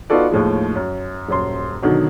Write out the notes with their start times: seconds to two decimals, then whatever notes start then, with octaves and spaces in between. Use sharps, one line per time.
0.10 B3 D#4 F4 F#4 A4 D5
0.31 D#2 A2 F3 G#3
0.75 F#2
1.29 D#1 F#2 C6
1.82 B2 D3 D#3 F#3